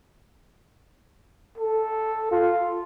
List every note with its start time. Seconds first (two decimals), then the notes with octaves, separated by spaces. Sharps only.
1.58 A4
2.31 F4